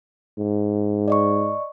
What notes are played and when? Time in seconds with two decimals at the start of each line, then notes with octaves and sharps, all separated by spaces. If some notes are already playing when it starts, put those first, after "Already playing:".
0.39 G#2
1.08 D5 D#5 C#6